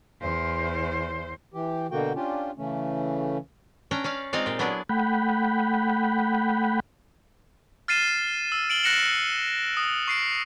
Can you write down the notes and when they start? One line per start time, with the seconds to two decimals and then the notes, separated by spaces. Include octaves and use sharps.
0.22 E2 C5
1.54 E3 G4
1.91 B2 D3 A#3 F#4 G5
2.15 C#4 D4 F4 G4
2.58 C#3 E3 A3 C#4
3.91 C#4 D4 G5 A#5
4.04 C#4 D5 F5
4.33 G#3 C4 D#4 F4 D5 F5
4.46 A#2 G4
4.59 F#3 B3 D4 E4 G#4 D5
4.89 A3 F#5 G5 B5
7.88 F6 A6 C7 D#7 E7
8.52 E6
8.70 D7 F#7 G7
8.83 F#6 A#6 C#7 E7 F#7
9.77 D#6
10.08 C#6 C7 D7